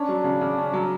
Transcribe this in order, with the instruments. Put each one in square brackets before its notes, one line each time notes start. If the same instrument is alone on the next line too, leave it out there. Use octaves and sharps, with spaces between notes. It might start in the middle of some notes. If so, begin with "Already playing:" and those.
Already playing: [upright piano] C#4 [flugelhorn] D4
[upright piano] F#3
C#3
C#3
C#4
F#3